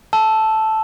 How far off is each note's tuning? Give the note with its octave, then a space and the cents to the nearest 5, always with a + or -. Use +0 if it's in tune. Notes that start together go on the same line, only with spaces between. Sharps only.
A5 -5 E6 +0